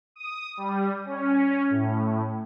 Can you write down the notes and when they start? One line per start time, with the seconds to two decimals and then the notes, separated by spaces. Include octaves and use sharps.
0.16 D#6
0.57 G3
1.05 C#4
1.70 A2